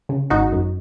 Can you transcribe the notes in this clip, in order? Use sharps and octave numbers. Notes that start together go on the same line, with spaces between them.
C#3
G#1 D#4 F#4
F#2